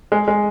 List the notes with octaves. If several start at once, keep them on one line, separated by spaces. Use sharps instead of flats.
G#3
G#3